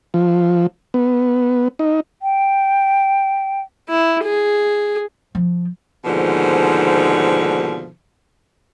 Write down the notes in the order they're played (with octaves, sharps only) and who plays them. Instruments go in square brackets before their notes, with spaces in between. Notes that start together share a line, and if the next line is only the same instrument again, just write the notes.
[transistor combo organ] F3
B3
D#4
[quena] G5
[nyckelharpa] E4
G#4
[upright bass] F3
[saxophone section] D#2 G#2 B2 D3 F3